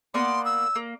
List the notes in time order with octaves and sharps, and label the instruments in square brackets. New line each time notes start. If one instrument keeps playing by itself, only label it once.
[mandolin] A#3 B3 D5 [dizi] C6
[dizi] E6
[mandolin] A#3